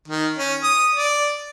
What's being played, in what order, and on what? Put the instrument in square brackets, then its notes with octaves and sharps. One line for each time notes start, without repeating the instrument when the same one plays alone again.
[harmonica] D#3
C#4
D#6
D5